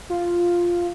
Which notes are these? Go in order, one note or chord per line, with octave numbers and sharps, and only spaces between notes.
F4